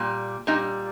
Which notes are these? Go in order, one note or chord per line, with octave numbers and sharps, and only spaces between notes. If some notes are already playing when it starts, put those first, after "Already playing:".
Already playing: A#2 G3
A#2 G3 D#4